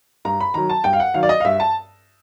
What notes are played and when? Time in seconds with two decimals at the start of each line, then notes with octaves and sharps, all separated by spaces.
0.25 G2 A#5
0.40 B5
0.54 D#3 F#3 A#5
0.69 A5
0.84 G2 G5
0.93 F5
1.00 F#5
1.14 D#3 F#3 F5
1.23 D5
1.29 D#5
1.40 F5
1.45 G2 E5
1.60 A5